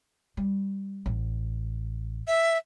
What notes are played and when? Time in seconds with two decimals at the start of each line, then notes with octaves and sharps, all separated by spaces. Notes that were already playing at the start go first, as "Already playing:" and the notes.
0.37 G3
1.06 A1
2.27 E5